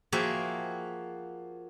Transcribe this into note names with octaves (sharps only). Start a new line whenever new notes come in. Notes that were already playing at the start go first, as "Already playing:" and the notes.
F3 A#3 F#4 G#4 E5 G5